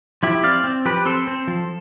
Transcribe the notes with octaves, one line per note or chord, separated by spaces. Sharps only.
F3 E4 G4
C4 D5 F5
C4
F3 G4 B4
C4 A4 C5
C4
F3